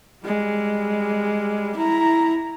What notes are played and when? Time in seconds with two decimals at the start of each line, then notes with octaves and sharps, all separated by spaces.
0.25 G3 G#3
1.76 E4 A#5